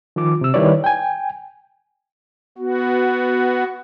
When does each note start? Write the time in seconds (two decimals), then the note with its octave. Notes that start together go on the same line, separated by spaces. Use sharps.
0.16 D#3 F3 F4 D6
0.41 C3 E6
0.54 D#3 G3 E4 B4 C#5 D5
0.84 G5 G#5
2.58 B3 F#4